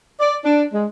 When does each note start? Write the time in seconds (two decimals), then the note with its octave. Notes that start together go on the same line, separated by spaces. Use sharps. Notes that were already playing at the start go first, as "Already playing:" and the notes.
0.20 D5
0.44 D4
0.73 G#3